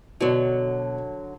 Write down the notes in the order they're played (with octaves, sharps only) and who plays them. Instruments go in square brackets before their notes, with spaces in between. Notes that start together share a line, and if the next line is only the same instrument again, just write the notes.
[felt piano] B2 [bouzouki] D3 F#3